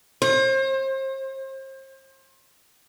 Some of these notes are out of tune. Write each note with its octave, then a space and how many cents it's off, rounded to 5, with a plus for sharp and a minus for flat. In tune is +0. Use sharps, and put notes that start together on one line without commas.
C5 +35